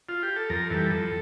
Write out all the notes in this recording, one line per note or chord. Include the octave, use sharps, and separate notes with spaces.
F4
G4
A4
F2 A#4
E3 G3 A4
F2 A4